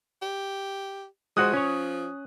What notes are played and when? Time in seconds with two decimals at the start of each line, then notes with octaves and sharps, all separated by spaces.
0.22 G4
1.37 F3 G#3 F#4 C5 D#6 F#6
1.54 C#4 C#5